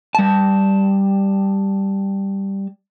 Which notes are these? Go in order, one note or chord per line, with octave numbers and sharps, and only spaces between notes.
G3 A5